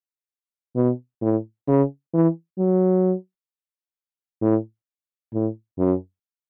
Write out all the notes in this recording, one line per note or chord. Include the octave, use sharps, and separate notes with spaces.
B2
A2
C#3
E3
F#3
A2
A2
F#2